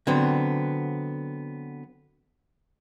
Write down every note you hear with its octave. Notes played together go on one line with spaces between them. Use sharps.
D3 F#3 B3 C4